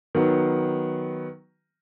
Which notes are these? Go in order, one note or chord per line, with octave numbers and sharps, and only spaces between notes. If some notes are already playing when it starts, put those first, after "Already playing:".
D#3 F#3 B3